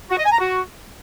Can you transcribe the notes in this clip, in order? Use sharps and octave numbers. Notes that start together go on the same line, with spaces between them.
F#4
D#5
G#5
A#5
F#4